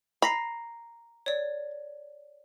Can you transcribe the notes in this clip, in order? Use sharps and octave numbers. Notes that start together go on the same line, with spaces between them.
A#5 B5 A#6 C7
C#5 D5